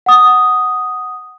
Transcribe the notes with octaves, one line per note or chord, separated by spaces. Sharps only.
F#5 D#6